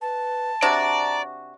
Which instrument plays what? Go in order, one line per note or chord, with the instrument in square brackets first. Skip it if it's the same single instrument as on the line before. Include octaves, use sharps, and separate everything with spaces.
[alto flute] B4 [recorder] A5
[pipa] C3 D4 F#4 [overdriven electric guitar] D5 [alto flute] A#5